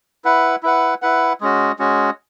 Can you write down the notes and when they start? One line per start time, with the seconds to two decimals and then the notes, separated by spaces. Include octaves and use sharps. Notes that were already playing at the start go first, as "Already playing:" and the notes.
0.25 E4 B4 F#5
0.63 E4 B4 F#5
1.02 E4 B4 F#5
1.41 G#3 C#4 F#4
1.79 G#3 C#4 F#4